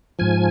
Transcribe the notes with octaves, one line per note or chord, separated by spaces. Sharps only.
G#2 F3 G#5